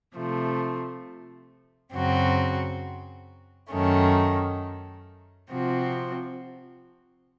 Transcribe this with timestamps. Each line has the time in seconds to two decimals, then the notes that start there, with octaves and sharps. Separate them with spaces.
0.14 C3 F3 A3
1.92 F#2 C#3 F#3 C4 F#4
3.71 F#2 D#3 A3 C#4
5.50 C3 F3 C4 F#4